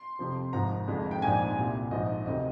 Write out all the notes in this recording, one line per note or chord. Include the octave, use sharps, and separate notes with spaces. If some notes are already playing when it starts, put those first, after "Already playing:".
Already playing: C6
F2 C3 F3
G#1 G#2 F3 A#5
F1 F2 D3 G#3
G5
A#1 G#2 F3 A#3 D4 G#5
C2 A#2 G3
A#1 G#2 F3 D#5
D2 C3 D#3 D#5